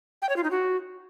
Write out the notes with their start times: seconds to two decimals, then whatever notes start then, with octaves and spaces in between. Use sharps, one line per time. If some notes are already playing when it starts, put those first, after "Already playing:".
0.22 G5
0.29 C#5
0.36 F4
0.44 D#4
0.51 F#4